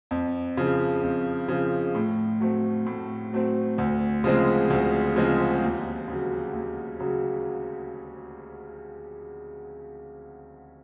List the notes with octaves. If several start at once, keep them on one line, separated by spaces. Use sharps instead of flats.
F2
C#3 F3
F2
C#3 F3
A2
F#3 A3 C4
A2
F#3 A3 C4
D2
C#3 F3 G#3 C4
D2
C#3 F3 G#3 C4
D#2
C#3 F#3
D#2
C#3 F#3